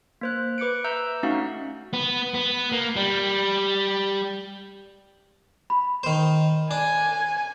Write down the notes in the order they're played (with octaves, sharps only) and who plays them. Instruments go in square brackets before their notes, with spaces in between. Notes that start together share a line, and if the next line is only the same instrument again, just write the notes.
[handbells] A#3 C5 F#6
B4 D6 F#6 C#7 D7
E5 A#5 E6 G6
A3 C#4 D#4 F#4 F5 F#5
[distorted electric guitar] B3
B3
A#3
G3
[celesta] B5
[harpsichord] D#3 C5
[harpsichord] D4 [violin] G#5